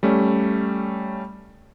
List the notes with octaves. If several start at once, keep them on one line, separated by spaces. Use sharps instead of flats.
G3 A3 C#4